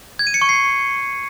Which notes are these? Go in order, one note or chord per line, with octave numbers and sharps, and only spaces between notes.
G#6
D#7
C#7
C#6
C7